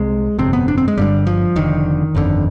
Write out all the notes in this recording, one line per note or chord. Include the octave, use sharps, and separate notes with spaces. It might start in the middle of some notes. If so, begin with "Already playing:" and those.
Already playing: C2 C3 G#3
G1 F2 C3 C4
B3
D4
C4
G#3
G1 G2 D3 G3
F3
F1 F2 D3 D#3
G1 F2 D3